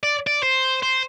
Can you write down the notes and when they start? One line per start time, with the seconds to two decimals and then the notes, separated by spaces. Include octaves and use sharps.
0.04 D5
0.27 D5
0.43 C5
0.82 C5